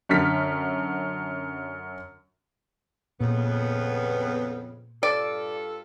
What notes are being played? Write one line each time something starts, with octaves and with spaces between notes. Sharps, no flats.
F#2 D3 F6 B6
F2 A#2 C#3 B3
G2 F4 A4 D5